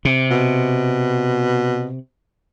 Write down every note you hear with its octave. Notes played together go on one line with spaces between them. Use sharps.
C3
B2